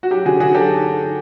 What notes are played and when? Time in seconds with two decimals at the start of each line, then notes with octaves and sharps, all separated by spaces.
0.03 F#4
0.10 F#3 G4
0.25 D3 F#4 G#4
0.40 D3 F#4 G#4
0.54 F#3 G4 A4